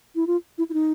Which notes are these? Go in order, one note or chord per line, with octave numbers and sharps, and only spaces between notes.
E4
F4
E4
E4
D#4